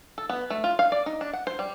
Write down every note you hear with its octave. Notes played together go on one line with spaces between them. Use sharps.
A4
B3
A3
F4
F5
D5
D#4
D4
F#5
C5
G3